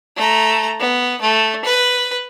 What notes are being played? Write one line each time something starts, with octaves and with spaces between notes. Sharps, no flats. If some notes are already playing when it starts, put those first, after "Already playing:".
A3 A#5
B3
A3
B4